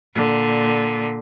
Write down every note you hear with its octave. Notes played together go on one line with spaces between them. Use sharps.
A#2 D3